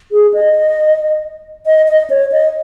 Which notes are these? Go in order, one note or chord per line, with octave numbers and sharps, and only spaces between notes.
G#4
D#5
D#5
D#5
C#5
D#5